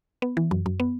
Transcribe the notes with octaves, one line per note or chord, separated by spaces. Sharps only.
B3
E3
F#2
F#2
B3